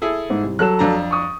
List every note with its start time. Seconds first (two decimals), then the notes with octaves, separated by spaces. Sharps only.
0.02 E4 G#4 A4
0.30 G#2
0.43 C2
0.59 F#3 A4 F#6 E7
0.79 F2 D4 A#5
1.11 C#6 D#6